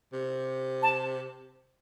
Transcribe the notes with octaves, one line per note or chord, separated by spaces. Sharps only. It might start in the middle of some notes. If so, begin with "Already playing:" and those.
C3
A5